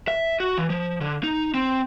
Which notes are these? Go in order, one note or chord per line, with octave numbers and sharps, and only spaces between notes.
E5
F#4
E3
F3
D3
D#4
C4